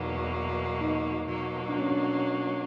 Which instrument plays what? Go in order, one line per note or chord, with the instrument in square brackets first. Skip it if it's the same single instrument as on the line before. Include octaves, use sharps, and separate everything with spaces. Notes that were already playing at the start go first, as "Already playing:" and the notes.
Already playing: [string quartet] E2 B2 F#3 A#3 [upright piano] D#4
[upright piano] D#4
[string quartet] B2 F#3 A#3
[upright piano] D4
C#4
D4